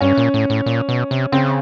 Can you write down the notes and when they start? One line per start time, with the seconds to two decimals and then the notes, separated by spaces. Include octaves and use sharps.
0.01 G2 C#4
0.17 A#2
0.34 A2
0.50 A2
0.66 A#2
0.89 B2
1.11 C3
1.32 C#3 C4